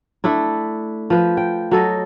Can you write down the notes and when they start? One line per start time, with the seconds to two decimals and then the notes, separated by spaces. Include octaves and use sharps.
0.24 A3 D4 E4
1.10 F3 B4
1.37 G5
1.71 F#3 A4 D#5